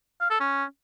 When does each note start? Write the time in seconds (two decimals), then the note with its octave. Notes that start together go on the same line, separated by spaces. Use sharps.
0.21 F5
0.30 A4
0.40 C#4